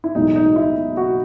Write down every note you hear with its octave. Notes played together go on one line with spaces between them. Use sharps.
E4
B1 A2 E3 G#3 D#4
D#4
E4
F#4